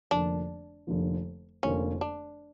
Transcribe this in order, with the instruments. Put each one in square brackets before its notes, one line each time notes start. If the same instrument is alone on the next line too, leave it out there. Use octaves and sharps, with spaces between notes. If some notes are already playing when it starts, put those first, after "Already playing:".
[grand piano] F1 F2 D3 F3 A#3 [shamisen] D4
[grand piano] F1 F2 D3 F3 A#3
[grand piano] F1 F2 D3 F3 A#3 [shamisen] C#4
[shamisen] D4